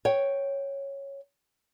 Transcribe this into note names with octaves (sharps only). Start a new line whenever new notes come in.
C#5 G5